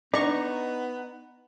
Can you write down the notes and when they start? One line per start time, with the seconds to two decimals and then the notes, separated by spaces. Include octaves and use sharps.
0.14 B3 D4 D#4 D5 A#5 C#6